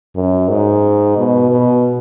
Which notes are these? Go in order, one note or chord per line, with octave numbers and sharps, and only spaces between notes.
F#2
G#2
B2
B2